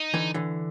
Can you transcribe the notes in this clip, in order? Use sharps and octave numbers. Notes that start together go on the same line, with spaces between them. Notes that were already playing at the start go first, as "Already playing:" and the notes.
Already playing: D#4
D3 E3
D3 E3